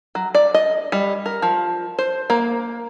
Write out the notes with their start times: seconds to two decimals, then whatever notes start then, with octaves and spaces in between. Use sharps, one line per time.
0.15 F#3
0.35 D5
0.54 D#5
0.92 G3
1.26 A#4
1.42 F3
1.98 C5
2.30 A#3